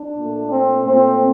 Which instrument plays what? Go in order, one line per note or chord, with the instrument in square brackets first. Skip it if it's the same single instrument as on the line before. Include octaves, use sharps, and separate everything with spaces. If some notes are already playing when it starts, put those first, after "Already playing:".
Already playing: [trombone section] D4
A#2 A3
C4
A#2 A3 C4